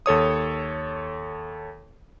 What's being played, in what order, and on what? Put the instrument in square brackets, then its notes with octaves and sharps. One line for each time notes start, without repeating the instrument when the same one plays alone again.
[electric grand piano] D#2 A4 C#5 D#6